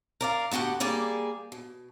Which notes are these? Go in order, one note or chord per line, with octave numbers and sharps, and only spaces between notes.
A#4 D5 F5
D2 B3 F#4 G4 F#5
G3 A#3 G#4 D5
B2